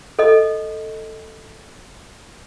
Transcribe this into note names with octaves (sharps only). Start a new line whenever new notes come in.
A4 D#5